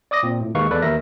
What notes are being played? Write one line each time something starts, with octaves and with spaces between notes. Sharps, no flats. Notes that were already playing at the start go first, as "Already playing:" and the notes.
D5 D6 D#6 A#6
A#2 C4
A2
D#2 D#3 G#3 B4 F5 C#6
E2 A4 B4 D5
D#2 A#4 E5 A#6